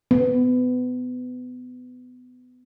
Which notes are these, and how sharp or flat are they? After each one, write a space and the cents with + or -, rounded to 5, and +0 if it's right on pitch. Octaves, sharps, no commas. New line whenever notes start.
B3 +25